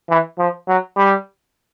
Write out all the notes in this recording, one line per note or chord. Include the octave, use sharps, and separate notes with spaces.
E3
F3
F#3
G3